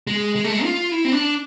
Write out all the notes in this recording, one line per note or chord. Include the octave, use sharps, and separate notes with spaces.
G#3
G#3
A3
G#3
F4
E4
C4
D4